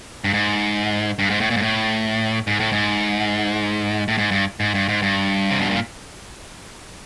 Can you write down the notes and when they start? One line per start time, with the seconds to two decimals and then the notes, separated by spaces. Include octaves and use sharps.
0.24 G2
0.33 G#2
1.19 G2
1.30 G#2
1.40 A2
1.50 A#2
1.57 G#2
1.62 A2
2.47 G#2
2.60 A2
2.72 G#2
4.08 A2
4.18 G#2
4.31 G2
4.60 G#2
4.74 G2
4.89 G#2
5.02 G2
5.50 C3
5.61 B2
5.70 A#2